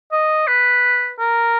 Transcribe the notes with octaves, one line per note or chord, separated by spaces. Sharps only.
D#5
B4
A#4